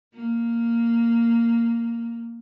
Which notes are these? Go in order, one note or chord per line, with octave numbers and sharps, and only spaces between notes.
A#3